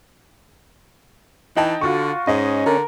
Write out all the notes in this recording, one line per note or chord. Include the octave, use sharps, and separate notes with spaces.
E3 D#4 G5 A5
D3 F4 F#4 C#6
G#2 C#4 D#5
D3 A#4